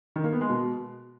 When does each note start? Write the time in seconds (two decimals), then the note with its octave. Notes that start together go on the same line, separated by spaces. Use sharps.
0.16 D#3
0.24 A#3
0.32 B3
0.41 G#3
0.49 B2